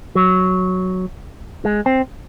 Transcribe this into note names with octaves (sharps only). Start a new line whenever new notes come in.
F#3
G#3
C4